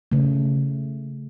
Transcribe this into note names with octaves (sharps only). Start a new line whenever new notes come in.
C#3 A3